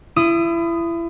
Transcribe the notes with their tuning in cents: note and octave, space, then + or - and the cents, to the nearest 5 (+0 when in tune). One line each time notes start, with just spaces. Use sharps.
E4 +30 D#6 -5